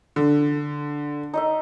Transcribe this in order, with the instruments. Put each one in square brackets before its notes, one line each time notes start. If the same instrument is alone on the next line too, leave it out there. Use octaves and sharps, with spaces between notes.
[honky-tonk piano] D3
[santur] D#4 D#5 E5